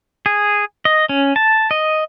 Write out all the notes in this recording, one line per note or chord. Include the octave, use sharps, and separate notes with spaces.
G#4
D#5
C#4
A5
D#5